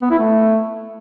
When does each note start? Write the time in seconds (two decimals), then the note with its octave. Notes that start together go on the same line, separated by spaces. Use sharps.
0.02 B3
0.11 E4
0.19 A3